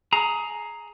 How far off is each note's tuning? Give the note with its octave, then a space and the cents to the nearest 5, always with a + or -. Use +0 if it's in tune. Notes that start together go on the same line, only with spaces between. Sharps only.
G#4 +20 A#5 +0